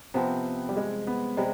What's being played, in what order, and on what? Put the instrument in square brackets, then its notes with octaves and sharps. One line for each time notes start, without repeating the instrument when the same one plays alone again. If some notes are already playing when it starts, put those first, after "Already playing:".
[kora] C3 F3 C4 [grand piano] B3
[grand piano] G3
G#3
B3
[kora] C3 G3 [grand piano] G#3